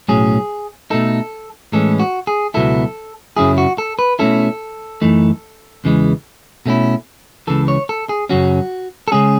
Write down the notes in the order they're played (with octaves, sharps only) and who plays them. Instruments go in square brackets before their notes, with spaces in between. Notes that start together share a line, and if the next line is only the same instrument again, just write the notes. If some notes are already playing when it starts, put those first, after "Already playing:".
[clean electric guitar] B1 A2 F#3 C#4 G#4
B2 A3 D#4 A4
A2 E3 G#3 C#4 A4
F#4
G#4
C#2 B2 F#3 B3 E4 A4
F#2 C#3 F#3 C#4 E4 G#4
F#4
A4
B4
B2 A3 C#4 E4 A4
F#2 E3 A3 D#4
E2 C#3 E3 G#3
B2 A3 C#4 E4
C#2 C#3 E3 A4
C#5
A4
G#4
F#2 C#3 F#3 C#4 F#4
A4
C#3 G#3 C#4 G#4